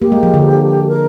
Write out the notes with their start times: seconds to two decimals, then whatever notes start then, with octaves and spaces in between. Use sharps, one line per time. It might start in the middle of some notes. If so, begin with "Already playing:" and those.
0.02 A#3 G4
0.12 G#3
0.23 F3
0.34 D3
0.88 A#4